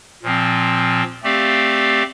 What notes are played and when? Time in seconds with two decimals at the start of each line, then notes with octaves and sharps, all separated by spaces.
0.23 A#2 F3 C4
1.23 A3 C4 G4 D5 F5